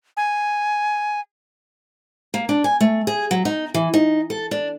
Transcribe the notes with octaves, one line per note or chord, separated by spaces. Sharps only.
G#5
A#3
D4
G#5
A3
G#4
F#3
D#4
E3
D#4
A4
D4